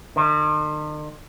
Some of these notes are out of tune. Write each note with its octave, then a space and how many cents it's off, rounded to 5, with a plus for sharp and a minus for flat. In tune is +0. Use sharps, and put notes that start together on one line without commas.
D#3 -45